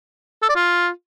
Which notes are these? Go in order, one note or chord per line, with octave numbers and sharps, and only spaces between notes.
A4
D5
F4